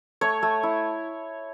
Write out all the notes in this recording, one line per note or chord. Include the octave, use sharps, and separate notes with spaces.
A3 C#5
A3
E4